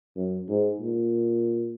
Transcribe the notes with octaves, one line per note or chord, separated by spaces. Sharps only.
F#2
G#2
A#2